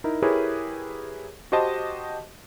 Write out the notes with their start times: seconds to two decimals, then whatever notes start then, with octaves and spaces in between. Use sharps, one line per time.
0.04 D#4 E4 A#4
0.22 E4 G4 G#4 A#4 B4 C#5
1.52 F#4 G4 C5 D#5 A5